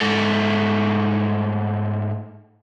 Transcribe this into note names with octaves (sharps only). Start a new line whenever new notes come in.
G#2 A3